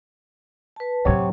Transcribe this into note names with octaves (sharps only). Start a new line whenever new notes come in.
B4 A5
D2 A2 C3 F#3 C#5